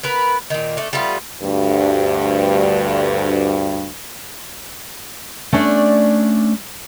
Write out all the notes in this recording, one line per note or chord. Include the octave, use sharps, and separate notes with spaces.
B3 A#4 B4
A#2 D#3
A3 D4
G3 A3 B3 F4
D2 G2
A3 C#4 D4 D5